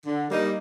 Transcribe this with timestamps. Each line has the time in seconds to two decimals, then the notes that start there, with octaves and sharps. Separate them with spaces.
0.05 D3
0.29 G3 A#3 D#4